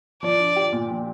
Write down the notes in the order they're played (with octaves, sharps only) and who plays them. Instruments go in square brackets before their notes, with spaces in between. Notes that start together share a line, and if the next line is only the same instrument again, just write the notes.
[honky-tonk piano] F3 [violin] D5
[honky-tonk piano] D4
G4
A#2
F3